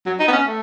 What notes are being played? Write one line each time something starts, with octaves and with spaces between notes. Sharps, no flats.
F#3
D#4
B3
C#4
A3